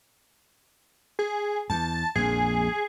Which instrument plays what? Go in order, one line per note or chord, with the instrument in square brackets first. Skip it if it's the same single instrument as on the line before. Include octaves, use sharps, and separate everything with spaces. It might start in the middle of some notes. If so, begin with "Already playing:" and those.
[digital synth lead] G#4
[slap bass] E2 [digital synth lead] A5
[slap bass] A#1 F2 A#2 [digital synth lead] G#4